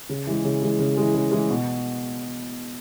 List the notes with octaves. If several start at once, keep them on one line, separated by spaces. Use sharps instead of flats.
C#3
E3 G#3
C#3
E3 G#3
C#3
E3 G#3
C#3
E3 G#3
B2